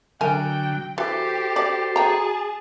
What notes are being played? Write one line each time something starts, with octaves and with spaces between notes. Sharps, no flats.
D3 F#3 A#4 G5 G#5
E3 F#4 G4 A4 C5
D5
G#4 G5 A5 A#5